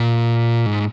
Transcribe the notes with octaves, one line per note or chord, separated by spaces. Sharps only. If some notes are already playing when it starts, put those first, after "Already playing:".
Already playing: A#2
G#2